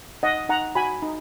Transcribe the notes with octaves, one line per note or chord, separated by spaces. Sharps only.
D#4 D#5 F#5
D#4 F#5 A#5
F#4 G#5 B5
D#4